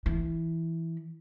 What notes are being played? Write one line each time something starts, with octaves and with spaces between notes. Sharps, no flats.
E3